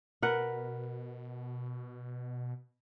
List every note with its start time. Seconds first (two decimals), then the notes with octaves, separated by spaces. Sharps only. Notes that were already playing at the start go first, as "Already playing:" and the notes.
0.22 B2 A#4 B4 F#5